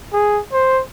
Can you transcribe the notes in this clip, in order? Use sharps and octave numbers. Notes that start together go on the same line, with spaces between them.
G#4
C5